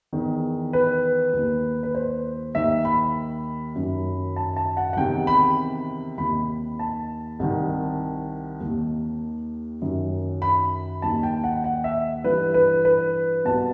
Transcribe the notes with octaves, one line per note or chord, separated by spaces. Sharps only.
E2 D#3
B4
D#2 D#3
B4
C5
D#2 D#3 E5
B5
F#2 D#3
A5
A5
F#5
F#5
E2 C3 D#3 G5
B5
D#2 D#3 B5
A5
C2 C3 D#3
D#2 D#3
F#2 D#3
B5
D#2 D#3 A5
G5
F#5
F#5
E5
G2 E3 B4
B4
B4
C2 B2 A5